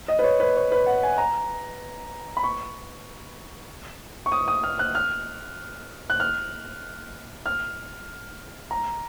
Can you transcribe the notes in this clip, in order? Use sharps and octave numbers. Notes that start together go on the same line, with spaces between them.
D#5
B4
C#5
B4
C#5
B4
F#5
G#5
A#5
B5
C#6
C#6
D#6
D#6
F6
F#6
F6
F#6
F6
F6
A#5